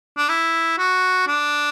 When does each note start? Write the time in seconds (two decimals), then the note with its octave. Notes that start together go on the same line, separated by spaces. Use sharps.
0.17 D4
0.29 E4
0.78 F#4
1.27 D4